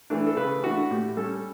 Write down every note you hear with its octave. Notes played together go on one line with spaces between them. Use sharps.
E3 A3 D4
A4
C#3 B4
E3 A3 D4 F#4
A2 G4
G3 C#4 A4